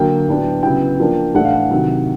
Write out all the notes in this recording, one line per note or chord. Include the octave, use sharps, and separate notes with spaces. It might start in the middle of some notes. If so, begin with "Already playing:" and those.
Already playing: D3 F#3 A#3 G5
A2 F#3 B3 D4
C#3 F#3 B3 E4 G5
F3 A#3 D4
A2 E3 A3 D4 F#5
F5
F#5
C3 D#3 F#3